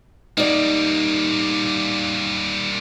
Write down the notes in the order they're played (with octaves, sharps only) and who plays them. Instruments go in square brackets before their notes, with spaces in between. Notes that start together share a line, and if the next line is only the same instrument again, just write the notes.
[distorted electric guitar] G3 A#3 [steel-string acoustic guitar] D#4 D5